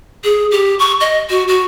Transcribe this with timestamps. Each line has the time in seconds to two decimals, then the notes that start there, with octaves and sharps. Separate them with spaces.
0.24 G#4
0.51 G4
0.79 C#6
1.00 D#5
1.30 F#4
1.48 F#4